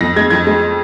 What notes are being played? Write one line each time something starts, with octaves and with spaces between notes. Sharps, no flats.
F2 A#6
G#3 G#6
F2 G#6
G#3